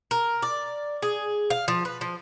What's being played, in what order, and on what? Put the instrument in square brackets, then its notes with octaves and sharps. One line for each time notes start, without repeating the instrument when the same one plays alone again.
[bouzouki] A#4
D5
G#4
F5
F3
B4
F3